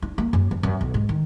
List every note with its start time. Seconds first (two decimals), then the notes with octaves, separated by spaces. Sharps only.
0.02 D4
0.18 A#3
0.33 F#2
0.51 F3
0.63 F#2
0.81 B1
0.94 G#2
1.09 D#3